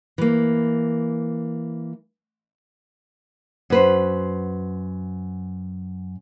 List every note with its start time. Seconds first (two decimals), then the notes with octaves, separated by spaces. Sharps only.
0.18 E3 A#3
3.70 F#2 B4 C5